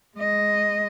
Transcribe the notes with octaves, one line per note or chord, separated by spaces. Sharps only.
G#3 D#5